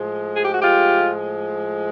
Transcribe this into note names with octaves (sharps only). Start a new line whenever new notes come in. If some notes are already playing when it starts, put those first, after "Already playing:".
Already playing: A2 F3 G#3
G#4
G4
F#4
F4 G4